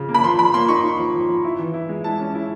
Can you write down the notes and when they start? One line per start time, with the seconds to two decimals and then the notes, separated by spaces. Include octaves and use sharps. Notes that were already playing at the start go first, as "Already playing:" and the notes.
Already playing: C#3 F3
0.09 A#3
0.14 B5
0.24 F3 C6
0.38 F3 B5
0.54 A#3 C6
0.68 D#4 C#6
0.84 D#4
0.99 F3
1.14 F3
1.29 F3
1.44 E4
1.59 E3
1.74 E4
1.89 G#3
2.04 E4 A5
2.20 C#4
2.35 E4